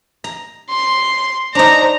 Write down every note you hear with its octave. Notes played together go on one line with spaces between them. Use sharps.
A#5
C6
D4 D#4 C5 A#5